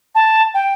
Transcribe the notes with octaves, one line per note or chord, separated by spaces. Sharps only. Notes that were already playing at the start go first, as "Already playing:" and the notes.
A5
G5